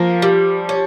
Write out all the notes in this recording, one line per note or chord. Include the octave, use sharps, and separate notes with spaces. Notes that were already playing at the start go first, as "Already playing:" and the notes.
Already playing: F3 A#3
G3
C#4